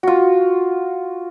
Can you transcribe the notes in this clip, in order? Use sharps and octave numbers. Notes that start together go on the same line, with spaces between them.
F4 F#4